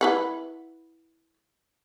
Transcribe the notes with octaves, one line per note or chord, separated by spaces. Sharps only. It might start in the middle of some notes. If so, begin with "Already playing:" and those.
E4 B4 F#5